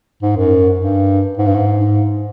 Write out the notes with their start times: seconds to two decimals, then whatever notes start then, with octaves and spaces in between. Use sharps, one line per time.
0.22 G#2
0.36 F#2
0.80 G2
1.38 G#2
1.47 G2
1.55 G#2